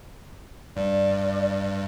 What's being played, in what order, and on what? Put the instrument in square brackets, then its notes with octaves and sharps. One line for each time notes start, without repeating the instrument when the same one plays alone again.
[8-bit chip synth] G2 [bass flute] D5